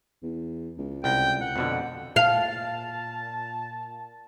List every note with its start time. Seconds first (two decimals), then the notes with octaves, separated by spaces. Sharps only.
0.22 E2
0.78 C#2
1.04 C2 G5
1.41 F#5
1.56 F2 B2 D3
2.16 A#2 F5 A5